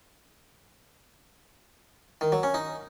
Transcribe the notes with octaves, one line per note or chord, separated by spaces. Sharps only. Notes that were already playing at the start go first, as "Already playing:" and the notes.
D#3
F#3
C#4
D#4